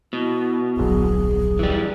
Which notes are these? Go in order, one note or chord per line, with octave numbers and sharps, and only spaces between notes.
B2 E4
D1 A#1 F#3 G#4
E3 G3